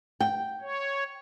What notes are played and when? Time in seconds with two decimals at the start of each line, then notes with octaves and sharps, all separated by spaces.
0.20 G5
0.62 C#5